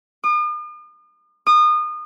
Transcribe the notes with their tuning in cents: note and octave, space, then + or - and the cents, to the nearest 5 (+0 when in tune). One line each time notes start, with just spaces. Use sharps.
D#6 -45
D#6 -30